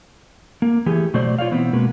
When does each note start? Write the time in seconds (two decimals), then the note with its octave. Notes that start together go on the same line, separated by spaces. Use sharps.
0.62 A#3
0.86 E3 A3 G4 G#4
1.14 B2 F#3 A3 C5 D5
1.38 F4 C#5 D5 F5
1.51 B2 E3 B3 C4
1.73 B2 G#3 A#3 F#4 B4